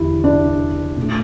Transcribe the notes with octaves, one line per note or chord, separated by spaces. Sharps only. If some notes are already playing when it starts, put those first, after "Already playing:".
Already playing: E2 D3 G3 E4
D4
A#2
A3